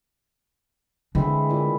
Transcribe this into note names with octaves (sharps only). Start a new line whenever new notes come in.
D3 E3 G#3 C4
A#2 E3